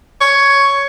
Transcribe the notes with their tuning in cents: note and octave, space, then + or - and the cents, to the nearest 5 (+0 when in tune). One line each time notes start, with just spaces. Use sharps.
C#5 +10